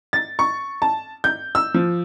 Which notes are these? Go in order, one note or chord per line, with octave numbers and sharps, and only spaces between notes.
A6
C#6
A5
G6
E6
F3